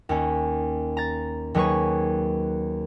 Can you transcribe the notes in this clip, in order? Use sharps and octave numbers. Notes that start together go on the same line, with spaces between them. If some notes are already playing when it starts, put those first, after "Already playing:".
D#2 C#4
A#5 A6
D#2 F#3 G#4 B4 C#5 C#6